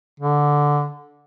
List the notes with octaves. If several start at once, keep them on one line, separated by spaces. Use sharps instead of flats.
D3